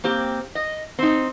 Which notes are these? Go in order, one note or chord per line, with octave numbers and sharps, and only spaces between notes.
A#3 C4 G4
D#5
C4 D#4